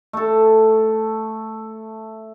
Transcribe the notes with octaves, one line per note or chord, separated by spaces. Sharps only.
A3 A4